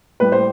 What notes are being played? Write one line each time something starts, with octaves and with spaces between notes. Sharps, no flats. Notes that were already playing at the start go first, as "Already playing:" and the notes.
A2 G3 B4
C5